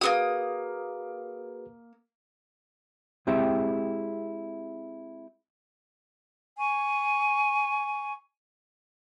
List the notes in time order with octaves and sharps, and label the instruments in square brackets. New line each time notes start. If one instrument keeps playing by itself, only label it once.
[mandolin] A#3 B3 D#6 [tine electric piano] F#4 G#4 B4
[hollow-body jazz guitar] G#3 C4 E4 G4 G#4 E5
[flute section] G#5 C#6